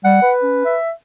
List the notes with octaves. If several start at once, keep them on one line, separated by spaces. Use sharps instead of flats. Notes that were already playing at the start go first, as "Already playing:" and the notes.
G3 F#5
B4
C#4
E5